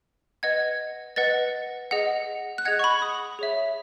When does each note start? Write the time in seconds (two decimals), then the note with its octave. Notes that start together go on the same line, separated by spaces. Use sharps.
0.43 B4 D#5 F#5 G#6
1.16 B4 D#5 F#5 A6
1.91 G#4 D#5 F#5
2.58 F#6
2.65 G#4 D#5 F#5 G#6
2.79 C#6
2.84 B5
3.02 D#6
3.39 G#4 C#5 E5